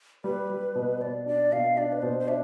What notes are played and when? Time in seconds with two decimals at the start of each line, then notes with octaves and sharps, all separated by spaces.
0.24 G3 B4
0.50 G3
0.75 B2
1.01 B2 D5
1.26 D4 D5
1.52 B2 F5
1.77 D4 D5
1.92 B4
2.02 B2 C5
2.20 C5
2.28 D4 E5